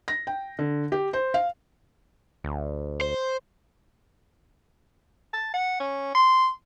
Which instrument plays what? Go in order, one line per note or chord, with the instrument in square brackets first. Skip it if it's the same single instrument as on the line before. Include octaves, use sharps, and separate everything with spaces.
[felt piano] A#6
G5
D3
G4
C5
F5
[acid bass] D2
[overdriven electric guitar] C5
[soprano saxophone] A5
F#5
C#4
C6